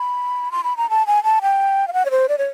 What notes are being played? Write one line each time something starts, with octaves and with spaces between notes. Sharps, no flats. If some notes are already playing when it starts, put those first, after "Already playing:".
Already playing: B5
C6
B5
A#5
A5
G#5
A5
G5
F5
F#5
C#5
C5
D5
C#5